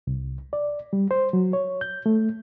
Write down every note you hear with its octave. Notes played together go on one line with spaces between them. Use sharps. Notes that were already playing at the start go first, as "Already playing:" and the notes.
C2
D5
G3
C5
F#3
C#5
G6
A3